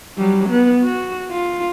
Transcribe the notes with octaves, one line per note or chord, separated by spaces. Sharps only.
F#3 G3
B3
F#4
F4